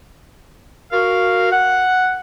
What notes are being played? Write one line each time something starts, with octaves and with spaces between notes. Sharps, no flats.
F#4 A#4 F5
F#5